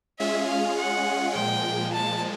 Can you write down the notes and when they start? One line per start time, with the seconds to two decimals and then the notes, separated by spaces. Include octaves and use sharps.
0.19 G#3 C#4 F4 G#4 E5
0.49 F5
0.78 F#5
1.35 A#2 F3 G#3 G5
1.93 A5